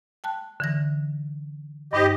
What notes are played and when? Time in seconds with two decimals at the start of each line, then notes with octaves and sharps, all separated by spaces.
0.24 G5 A5 F#6
0.60 D3 E3 A#6
1.93 G2 D#4 G4 C5 D#5